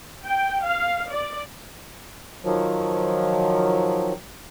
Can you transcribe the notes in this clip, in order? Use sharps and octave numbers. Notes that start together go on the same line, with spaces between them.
G5
F5
D5
D#3 F3 F#3